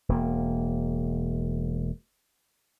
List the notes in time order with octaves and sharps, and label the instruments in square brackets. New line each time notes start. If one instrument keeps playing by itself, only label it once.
[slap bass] E1 A#3